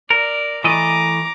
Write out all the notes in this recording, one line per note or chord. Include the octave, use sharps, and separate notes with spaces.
A#4 D5
E3 A3 D#5 A#5 D6